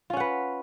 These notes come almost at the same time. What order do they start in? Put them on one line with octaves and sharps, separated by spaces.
F4 C#4 F#5 B4